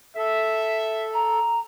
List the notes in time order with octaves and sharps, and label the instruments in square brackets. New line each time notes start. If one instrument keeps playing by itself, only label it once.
[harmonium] A4 [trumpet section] E5
[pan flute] A#5